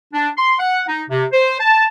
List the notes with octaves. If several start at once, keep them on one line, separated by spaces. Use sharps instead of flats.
D4
C6
F#5
D#4
C3
C5
A5